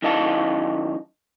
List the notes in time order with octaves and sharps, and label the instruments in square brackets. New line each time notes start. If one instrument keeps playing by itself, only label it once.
[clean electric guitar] F#2 D#3 E4 D#5 F5 A5